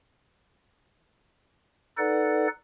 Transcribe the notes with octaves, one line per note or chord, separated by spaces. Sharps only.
D#4 A4 B4 D5 F#5